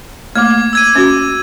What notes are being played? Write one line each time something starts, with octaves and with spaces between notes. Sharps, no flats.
A3 A#3 D6 G#6
E6 G#6 D#7
C#4 F#4